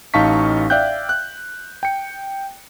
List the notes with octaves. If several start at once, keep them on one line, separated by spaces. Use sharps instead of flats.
A1 D#4 F5 A5 C#6 B6
D5 E5 F5 G5 F#6 G6
F#6
G5 C#7